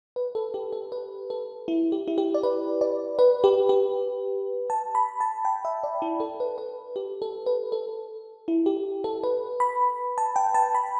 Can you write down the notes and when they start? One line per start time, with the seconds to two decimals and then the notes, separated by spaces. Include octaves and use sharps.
0.16 B4
0.35 A4
0.54 G4
0.73 A4
0.92 B4
1.30 A4
1.68 E4
1.92 G4
2.08 E4
2.18 G4
2.34 D5
2.43 B4
2.81 D5
3.19 B4
3.44 G4
3.69 G4
4.70 A5
4.95 B5
5.20 A5
5.45 G5
5.65 E5
5.84 D5
6.02 E4
6.20 A4
6.40 B4
6.58 B4
6.96 G4
7.22 A4
7.46 B4
7.72 A4
8.48 E4
8.66 G4
9.04 A4
9.23 B4
9.60 B5
10.18 A5
10.36 G5
10.55 A5
10.75 B5